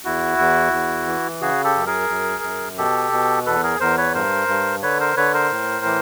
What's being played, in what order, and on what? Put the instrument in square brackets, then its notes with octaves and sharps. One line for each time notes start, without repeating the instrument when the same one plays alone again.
[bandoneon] E2 E4 F#4
E2
E2
E3
C#3 F#4 G#4
G4 A4
F#2
G#4 A#4
F#2
F#2
B2 G4 A4
B2
E2 A4 B4
G#4 A#4
E2 A#4 C5
B4 C#5
G2 A#4 C5
G2
D3 B4 C#5
A#4 C5
D3 B4 C#5
A#4 C5
A2
E3